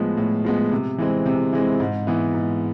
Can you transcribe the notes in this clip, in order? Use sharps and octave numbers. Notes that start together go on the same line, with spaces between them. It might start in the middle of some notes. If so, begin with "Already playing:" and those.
Already playing: A2 F3 G#3 B3
A2
F3 G#3 B3
C3
E3 G#3 C4
C3
E3 G#3 C4
G#2
E3 B3
G#2